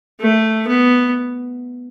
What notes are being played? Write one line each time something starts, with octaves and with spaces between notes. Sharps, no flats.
A3
B3